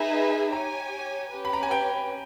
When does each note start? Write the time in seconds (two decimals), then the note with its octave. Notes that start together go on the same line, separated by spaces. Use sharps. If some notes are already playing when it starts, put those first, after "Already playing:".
Already playing: D#4 G#4 B4 E5 G#5 B5
0.52 G4 C#5 G#5 A#5
1.31 C#4 G4 B4
1.45 B5
1.53 A#5
1.63 G#5
1.71 G5